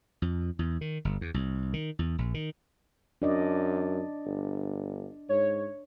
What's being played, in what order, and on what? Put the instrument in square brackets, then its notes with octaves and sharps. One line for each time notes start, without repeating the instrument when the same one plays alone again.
[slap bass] F2
E2
D#3
G1
E2
C2
D#3
E2
A#1
D#3
[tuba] F#2 [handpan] D4 D5 D#5
[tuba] G1
[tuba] G#2 [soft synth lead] C#5